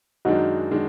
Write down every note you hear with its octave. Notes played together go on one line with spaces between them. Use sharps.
F#2 D#3 G#3 D4 D#4 F#4
D#3 G#3 D4